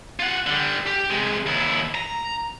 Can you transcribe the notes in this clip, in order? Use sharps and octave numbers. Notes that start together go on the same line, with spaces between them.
F4 F#5
D3 G3
G4
C3 G#3
D#2 E4
A#5